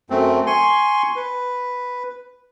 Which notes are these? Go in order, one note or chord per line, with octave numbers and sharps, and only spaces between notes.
F#2 A3 C4
G#5 C6 C#6
B4